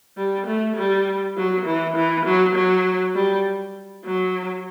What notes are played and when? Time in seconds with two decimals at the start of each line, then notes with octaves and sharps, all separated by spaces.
0.17 G3
0.46 A3
0.76 G3
1.37 F#3
1.65 E3
1.96 E3
2.25 F#3
2.55 F#3
3.15 G3
4.05 F#3